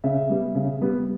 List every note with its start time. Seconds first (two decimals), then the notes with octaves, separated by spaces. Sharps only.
0.04 C#3 E5
0.30 G3 B3
0.55 C#3
0.82 G3 B3